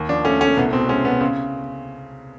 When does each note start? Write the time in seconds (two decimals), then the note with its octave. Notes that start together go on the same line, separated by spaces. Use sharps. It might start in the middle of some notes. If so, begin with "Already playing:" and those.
Already playing: D#2
0.09 F3 D4
0.24 A3 C#4
0.41 A3 C#4
0.57 C2 B3
0.73 B2 C4
0.89 G#3 C#4
1.05 B2 B3
1.21 C#3 C4